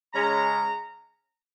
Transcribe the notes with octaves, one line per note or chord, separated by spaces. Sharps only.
C#3 G#3 C#4 A#5